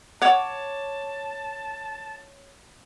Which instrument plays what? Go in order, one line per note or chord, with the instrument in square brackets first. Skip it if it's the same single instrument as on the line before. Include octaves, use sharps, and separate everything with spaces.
[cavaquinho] C#5 D6 [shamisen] F#5 [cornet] A5